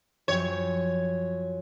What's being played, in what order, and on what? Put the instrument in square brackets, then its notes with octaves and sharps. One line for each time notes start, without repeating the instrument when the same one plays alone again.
[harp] F#2 F3 G5 [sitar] C#5